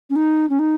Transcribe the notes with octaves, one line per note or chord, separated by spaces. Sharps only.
C#4
D#4
C#4
D#4